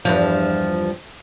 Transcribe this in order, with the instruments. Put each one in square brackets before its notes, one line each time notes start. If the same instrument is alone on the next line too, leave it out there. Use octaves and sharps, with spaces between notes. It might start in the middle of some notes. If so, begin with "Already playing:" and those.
[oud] E2 G2 F3